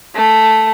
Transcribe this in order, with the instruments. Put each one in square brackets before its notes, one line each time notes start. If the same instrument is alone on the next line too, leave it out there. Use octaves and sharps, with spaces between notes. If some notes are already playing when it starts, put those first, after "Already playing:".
[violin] A3